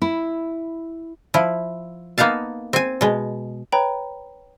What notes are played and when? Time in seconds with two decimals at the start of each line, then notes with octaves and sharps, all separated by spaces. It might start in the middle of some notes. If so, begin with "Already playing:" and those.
0.02 E4
1.34 F3 E4
2.18 A#3 B3 D#4 F5 A5
2.73 C4 G#5
3.01 B2 G#3
3.72 B4 C#5 G5 A#5 B5